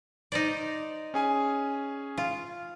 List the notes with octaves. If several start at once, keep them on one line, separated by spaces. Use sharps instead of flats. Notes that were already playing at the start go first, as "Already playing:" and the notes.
D#4 C5 D5
C#4 G#4 G#5
F4